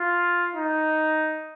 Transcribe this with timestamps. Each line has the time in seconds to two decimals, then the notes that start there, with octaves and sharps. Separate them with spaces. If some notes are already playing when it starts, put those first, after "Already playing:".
Already playing: F4
0.55 D#4